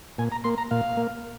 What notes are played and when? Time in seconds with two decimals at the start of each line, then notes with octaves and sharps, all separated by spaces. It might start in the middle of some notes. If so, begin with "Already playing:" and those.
0.19 A#2 G#5
0.32 A#5
0.44 A#3 C6
0.58 A#5
0.71 A#2 F5
0.97 A#3